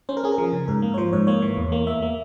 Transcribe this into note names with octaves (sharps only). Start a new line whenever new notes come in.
C#4 C5
A#4
C#4 G#4
A#4
F3
C#3
G#2 A#4
A#3
C#5
F3 C5
G#2 C#5
A#3 C#5
E3
E2
A#3
A#3 E5
A#3